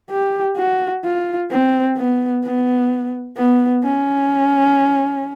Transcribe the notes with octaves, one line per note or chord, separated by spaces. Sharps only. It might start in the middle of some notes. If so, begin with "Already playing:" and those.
G4
F#4
F4
C4
B3
B3
B3
C#4